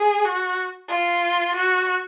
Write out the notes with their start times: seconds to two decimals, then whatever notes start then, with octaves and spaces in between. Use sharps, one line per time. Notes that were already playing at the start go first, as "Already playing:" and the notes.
Already playing: G#4
0.25 F#4
0.89 F4
1.55 F#4